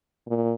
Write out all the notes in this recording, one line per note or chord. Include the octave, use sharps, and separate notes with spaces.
A#2